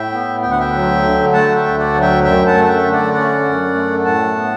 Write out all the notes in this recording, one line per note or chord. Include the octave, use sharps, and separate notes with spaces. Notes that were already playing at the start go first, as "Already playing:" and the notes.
Already playing: A2 E5 G5
B3
D2 G5
F#5
E5 G5
F#3
D3
A3 F#5 A5
E5 G5
D2
D5 F#5
F#3
E5 G5
F#2 E5 G5
F#5 A5
A3
A5
E5 G5
D3
D5 F#5
C#4 D5 F#5
F#2
A3
A2 F#5 A5
B3